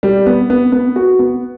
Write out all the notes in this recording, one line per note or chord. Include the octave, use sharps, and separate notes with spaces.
G3
B3
B3
B3
F#4
B3